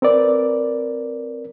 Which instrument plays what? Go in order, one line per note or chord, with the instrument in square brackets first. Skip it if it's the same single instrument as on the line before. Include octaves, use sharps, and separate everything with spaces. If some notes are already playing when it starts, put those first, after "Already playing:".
[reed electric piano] C4 A#4 B4 D5